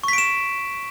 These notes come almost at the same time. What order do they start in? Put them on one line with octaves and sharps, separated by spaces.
C#6 B6 D7 E7